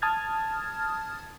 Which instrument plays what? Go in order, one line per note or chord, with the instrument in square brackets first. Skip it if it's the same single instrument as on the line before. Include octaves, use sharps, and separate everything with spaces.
[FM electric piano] A5 D#6 F6 G#6 A6